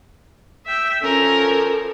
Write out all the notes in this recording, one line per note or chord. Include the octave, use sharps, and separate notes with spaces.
E5 G5
F3 C#4 A4 A#4